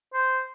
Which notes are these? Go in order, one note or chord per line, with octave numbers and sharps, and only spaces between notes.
C5